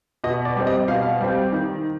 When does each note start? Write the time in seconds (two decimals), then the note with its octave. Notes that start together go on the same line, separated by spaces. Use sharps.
0.24 B2 D#5
0.45 D5
0.56 G3 C4
0.67 D#5
0.88 B2 F5
1.21 G3 C4
1.52 D#3